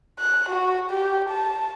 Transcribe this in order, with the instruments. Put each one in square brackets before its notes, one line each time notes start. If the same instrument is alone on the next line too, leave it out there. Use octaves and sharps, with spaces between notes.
[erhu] F#6
F#4
G4
A5